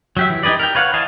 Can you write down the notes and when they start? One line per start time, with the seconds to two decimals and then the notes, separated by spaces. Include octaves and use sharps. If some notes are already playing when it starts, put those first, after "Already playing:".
0.17 F#3 G4 E5
0.30 E3
0.43 D#4 G4 G#4 B4 D5
0.59 A#4 G5
0.75 B4 C#5 F5 F#5
0.94 E3 D#5 F5 G#5 A5